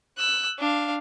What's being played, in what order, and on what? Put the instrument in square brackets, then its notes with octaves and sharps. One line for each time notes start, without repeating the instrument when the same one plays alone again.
[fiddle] E6 F#6
D4 F5